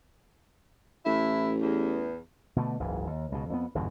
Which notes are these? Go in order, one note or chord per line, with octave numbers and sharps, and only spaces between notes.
A1 A2 E4
E2
B2 D3 A3
F#1 C#2 G#2 E3
D#2
C#2 B2
F2 F#3 B3
G1 E2 G#2 B2